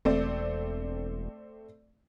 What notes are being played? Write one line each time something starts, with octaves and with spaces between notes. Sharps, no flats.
E1 A3 C4 D5